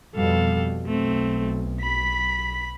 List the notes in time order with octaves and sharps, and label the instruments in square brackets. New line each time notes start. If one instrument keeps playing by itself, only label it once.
[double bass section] F2 B2 G3 [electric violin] A4 F5
[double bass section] B1 [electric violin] A3 C4
[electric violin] B5 B6